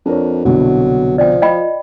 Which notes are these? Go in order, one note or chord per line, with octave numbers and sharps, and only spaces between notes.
F2 D4 A#4 C#5
C2 B2 D3 F#3
F3 D5 G5
F4 D#5 G5 B5